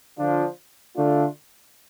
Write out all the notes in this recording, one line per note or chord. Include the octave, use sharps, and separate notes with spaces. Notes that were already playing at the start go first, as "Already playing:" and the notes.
D3 F3 D4 F4
D3 A3 D4 F4